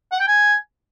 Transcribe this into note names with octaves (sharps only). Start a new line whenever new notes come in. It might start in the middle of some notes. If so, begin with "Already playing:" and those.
F#5
G5
G#5